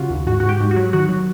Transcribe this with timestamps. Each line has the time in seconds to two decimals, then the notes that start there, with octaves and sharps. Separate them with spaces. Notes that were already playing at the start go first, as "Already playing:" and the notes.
Already playing: C#3 F4 F#4
0.10 D#2
0.27 G#2 F#4
0.40 G#2 F#4
0.49 G4
0.60 G#2
0.71 F#4
0.76 F#3
0.93 D#3 F#4
1.09 F#3